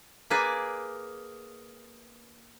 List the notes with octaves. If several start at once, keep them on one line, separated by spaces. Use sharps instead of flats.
A#3 G#4 B4 D5 G#5